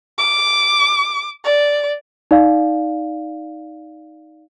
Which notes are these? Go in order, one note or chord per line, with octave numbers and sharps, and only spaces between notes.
D6
D5
D#4 D5 F5